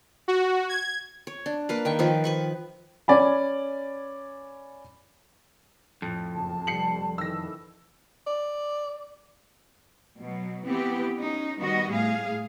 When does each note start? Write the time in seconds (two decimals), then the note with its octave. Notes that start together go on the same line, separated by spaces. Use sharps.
0.28 F#4
0.69 G#6
1.27 C#5
1.46 D4
1.69 A#3 B4 F5
1.85 D#3 G5 C#6
1.99 D#3 F3 B4
2.24 B4 B5 C#6
3.08 C#4 D5 G#5 B5
6.02 F2 A2
6.34 F#1 A5
6.67 F1 G3 C7 C#7 F#7
7.18 D#3 E3 E6 A#6
8.27 D5
10.19 B2 F#3
10.65 E3 B3 C4 G4
11.15 C#4 D#4
11.59 D#3 G3 B3 F#4 D#5
11.91 A2 G#4 F5